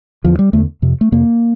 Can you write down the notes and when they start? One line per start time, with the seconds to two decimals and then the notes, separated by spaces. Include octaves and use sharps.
0.24 E2 D3 F3
0.39 G3
0.53 E2 D3 A3
0.82 F2 C3
1.01 A3
1.12 F2 C3 A#3